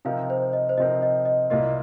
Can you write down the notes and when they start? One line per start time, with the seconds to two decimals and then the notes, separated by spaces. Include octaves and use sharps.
0.05 C3 F3 C4 D#4 A#4 F5
0.30 C5
0.53 D#5
0.69 C5
0.78 C3 F3 C4 D#4 A#4 D#5
1.02 D#5
1.25 D#5
1.50 C2 A#2 A#3 F4 D#5